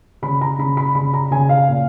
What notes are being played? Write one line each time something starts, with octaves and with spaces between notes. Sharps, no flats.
C#3 B5
A#5
C#3 B5
B5
C#3 B5
A#5
C#3 G#5
F5
A#2